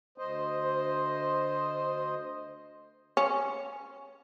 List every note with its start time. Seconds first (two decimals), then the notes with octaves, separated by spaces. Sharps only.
0.18 D2 C5 D#5
3.17 C#4